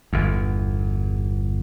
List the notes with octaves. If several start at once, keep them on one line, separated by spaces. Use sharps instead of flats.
G1 E2